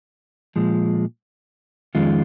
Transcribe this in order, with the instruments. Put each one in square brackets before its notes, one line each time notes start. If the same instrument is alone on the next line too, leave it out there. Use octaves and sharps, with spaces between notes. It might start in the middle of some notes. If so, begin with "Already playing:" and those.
[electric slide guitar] A#2 F3 G#3
F2 D#3 G#3 C#4 F4